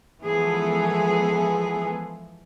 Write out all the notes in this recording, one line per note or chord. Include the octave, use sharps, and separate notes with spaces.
E3 F3 G#3 B3 G#4 A4